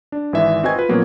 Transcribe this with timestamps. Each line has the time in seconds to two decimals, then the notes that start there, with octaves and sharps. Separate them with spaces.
0.12 D4
0.33 G#1 E3 E5
0.63 C4 F#4 B4 D#5 G#5 G#6
0.76 F4 B4
0.89 A#2 F3 F#3 A#3 B3 C#4